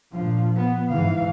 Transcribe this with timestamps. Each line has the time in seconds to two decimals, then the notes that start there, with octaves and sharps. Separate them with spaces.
0.13 A#2 F3 D4 F4
0.57 B3
0.89 G#2 E3 F5